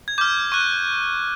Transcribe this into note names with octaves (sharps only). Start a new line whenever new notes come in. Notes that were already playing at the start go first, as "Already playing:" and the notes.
G#6
D6 F6 G6
C#6 F#6